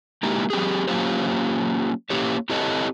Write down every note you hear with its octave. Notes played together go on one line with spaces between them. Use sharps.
G#3 A#3 D#4 E4 G4
F#3 C4 G4 G#4
F#3 A#3 C#4 F4 G4 C5
A#3 C#4 E4 G4 C#5
C4 E4 G4 A4 C#5 D#5